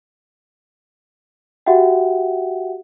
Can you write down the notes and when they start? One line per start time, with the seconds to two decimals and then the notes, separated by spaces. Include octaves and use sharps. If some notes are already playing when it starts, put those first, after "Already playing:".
1.66 F#4 G4 E5 F#5 G5